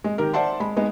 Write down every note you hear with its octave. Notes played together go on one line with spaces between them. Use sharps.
G#3
D#3 G4 A#4
C5 D5 E5 F#5 A5 C6
G#3 B5
G#3 B3 D#4